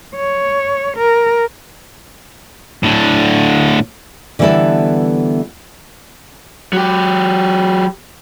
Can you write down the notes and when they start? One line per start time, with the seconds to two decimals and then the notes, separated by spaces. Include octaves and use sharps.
0.16 C#5
0.97 A#4
2.83 A2 D3
4.39 D3 E3 G3 B3 E4 A4
6.73 F#3 G4